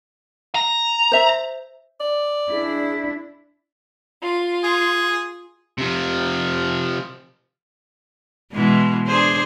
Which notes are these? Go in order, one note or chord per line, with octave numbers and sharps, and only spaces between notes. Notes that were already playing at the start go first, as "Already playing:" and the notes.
A#5
C5 E5
D5
D4 E4 G#4
F4
G#4
C3 F3
B2 E3 G#3
D4 G#4 C5